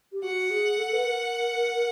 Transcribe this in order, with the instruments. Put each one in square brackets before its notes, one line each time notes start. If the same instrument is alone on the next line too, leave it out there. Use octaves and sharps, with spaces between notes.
[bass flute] G4
[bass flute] F#4 [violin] F#5
[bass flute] G#4
A4
B4
A#4